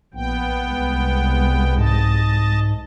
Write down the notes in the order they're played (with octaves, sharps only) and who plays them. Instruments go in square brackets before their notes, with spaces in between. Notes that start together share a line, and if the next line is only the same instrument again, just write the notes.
[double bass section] A#1 [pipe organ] B3 G5
[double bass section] C2 G#3
[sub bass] G#2 [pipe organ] D#5 A5